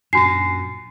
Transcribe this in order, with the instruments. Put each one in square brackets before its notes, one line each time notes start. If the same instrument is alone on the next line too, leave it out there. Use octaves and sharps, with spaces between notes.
[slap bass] F#2 A#2 [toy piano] D4 F#4 [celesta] C7